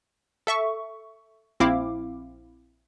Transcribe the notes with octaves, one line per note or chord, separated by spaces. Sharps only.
A4 E5 C#6
A#1 C4 E4 F5 D6